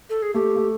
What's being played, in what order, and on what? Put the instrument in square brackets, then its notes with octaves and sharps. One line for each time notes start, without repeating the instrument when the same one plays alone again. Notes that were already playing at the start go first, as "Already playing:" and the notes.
[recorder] A4
G#4
[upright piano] A3 [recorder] G4
[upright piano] A3